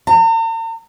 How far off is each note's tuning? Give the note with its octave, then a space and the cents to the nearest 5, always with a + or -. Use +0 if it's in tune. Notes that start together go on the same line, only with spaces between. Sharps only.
A#5 -45